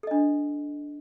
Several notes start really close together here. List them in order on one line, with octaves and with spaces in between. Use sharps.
A4 D#5 D4